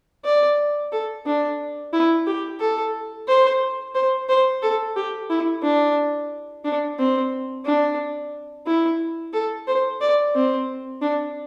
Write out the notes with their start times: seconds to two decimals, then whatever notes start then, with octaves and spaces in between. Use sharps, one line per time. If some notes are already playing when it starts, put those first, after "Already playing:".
0.25 D5
0.92 A4
1.26 D4
1.93 E4
2.27 G4
2.60 A4
3.28 C5
3.95 C5
4.29 C5
4.62 A4
4.96 G4
5.30 E4
5.63 D4
6.64 D4
6.98 C4
7.65 D4
8.67 E4
9.33 A4
9.67 C5
10.01 D5
10.35 C4
11.02 D4